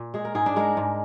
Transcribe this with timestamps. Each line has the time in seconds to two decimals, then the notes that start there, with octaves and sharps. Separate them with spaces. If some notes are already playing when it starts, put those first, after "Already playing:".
Already playing: A#2
0.14 G#3 G#4
0.25 A#4
0.35 G#2 G#4
0.46 D4
0.56 G#3 A#4
0.77 G#2